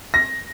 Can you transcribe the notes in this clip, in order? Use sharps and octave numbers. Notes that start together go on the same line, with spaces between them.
A#6